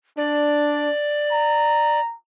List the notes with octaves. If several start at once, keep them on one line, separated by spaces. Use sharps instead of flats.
D4 D5
A#5